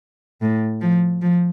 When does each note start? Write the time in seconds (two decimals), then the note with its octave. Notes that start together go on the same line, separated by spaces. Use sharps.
0.42 A2
0.81 F3
1.22 F3